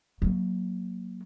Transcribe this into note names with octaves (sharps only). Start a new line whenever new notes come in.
F#3 A#3